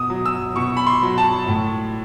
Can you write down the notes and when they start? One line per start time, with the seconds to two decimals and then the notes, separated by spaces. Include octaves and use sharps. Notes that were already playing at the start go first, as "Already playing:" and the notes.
Already playing: B2 D#6
0.10 F#3
0.26 E6
0.56 B2 C#6
0.77 B5
0.87 C6
1.03 F#3
1.18 A5
1.49 A2